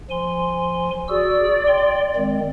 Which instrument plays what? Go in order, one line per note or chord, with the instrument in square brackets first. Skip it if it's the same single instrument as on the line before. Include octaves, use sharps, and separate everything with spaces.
[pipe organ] F3 G#5 C6
[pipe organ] F#4 G#4 E6 [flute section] D5
[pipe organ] G5 C6
D#3 G#3 C4